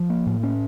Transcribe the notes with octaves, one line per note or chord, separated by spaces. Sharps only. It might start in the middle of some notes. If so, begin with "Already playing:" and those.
Already playing: F3
A#3
A2
C#4